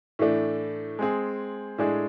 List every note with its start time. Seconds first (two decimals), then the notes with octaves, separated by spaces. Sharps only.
0.19 A2 E3 A3 D4
0.99 G#3 C4 G#4
1.78 A2 G#3 D4 G#4